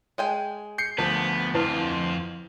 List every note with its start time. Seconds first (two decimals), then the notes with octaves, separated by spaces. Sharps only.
0.18 G#3 G5 G#5
0.78 G6 C7 C#7
0.98 D2 F3 B3 A#4 A5
1.55 F2 E4 F4 B4 A5